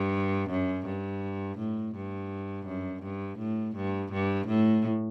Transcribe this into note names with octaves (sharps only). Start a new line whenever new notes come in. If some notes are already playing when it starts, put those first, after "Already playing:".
Already playing: G2
F#2
G2
A2
G2
F#2
G2
A2
G2
G2
A2